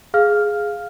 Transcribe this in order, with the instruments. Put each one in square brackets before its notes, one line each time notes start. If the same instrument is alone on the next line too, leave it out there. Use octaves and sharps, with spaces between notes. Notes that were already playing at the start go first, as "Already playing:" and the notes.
[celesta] G#4 F5 F6